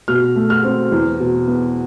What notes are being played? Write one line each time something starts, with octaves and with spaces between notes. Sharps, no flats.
B2 F6
A3
F6
C4
E2
B2
B3